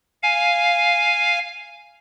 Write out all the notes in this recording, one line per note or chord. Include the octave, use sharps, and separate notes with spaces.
F5 G#5